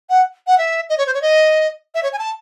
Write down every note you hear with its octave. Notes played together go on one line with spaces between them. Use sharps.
F#5
F#5
E5
D#5
C#5
C5
C#5
D#5
E5
C#5
G#5
A5